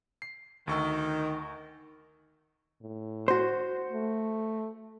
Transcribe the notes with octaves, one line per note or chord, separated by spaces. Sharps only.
C7
D2 D#3 C#6 E6
A2
F#4 C5
A3